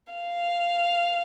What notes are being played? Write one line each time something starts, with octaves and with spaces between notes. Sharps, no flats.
F5